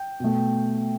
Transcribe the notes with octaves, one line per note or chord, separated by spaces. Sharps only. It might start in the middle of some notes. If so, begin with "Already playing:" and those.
Already playing: G5
B2 A3